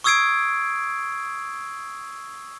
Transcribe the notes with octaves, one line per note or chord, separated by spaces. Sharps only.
C#6 D#6 E6 G#6 C7 D7